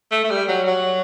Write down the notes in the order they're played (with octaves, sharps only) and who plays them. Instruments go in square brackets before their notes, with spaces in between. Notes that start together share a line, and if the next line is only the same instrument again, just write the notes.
[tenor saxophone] A3
A3
G3
F#3
F#3